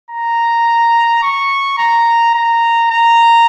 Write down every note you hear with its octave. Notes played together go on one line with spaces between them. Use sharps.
A#5
C#6
A#5
A#5
A#5